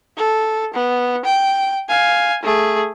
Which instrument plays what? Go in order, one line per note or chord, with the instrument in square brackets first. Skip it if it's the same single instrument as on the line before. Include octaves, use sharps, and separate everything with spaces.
[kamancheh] A4
B3
G5
F5 G#5
A3 G#4